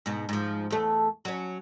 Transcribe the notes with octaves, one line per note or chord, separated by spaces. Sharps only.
G#2 B2
G#2 F3
E2 A3
F#3 C#4